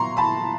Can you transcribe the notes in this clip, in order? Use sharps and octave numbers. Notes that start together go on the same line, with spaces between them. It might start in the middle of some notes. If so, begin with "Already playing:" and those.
Already playing: A#2 F#3 B3 A#5 C6 C#6
A5 B5